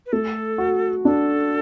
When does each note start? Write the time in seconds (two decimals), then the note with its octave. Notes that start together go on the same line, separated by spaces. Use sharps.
0.06 B4
0.12 A3 A4
0.58 F#4
1.05 D4 A4